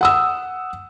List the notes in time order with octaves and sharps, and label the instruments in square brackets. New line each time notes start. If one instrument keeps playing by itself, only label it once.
[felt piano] F#5 D#6 E6